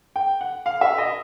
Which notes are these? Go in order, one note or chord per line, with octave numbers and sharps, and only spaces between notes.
G5
F#5
F5
E5
D#5